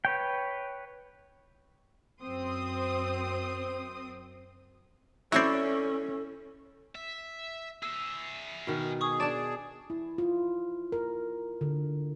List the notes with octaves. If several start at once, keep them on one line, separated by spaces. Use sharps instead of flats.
B4 C#5 G5
F#2 C4 C6 D#6
F#3 C4 C#4 E4 A4 C#5 D5
E5
G#4 E5 E6
B2 D#3
G#4 C#6 D#6
D4 D5 A5 E7
E4
F4
A#4
D3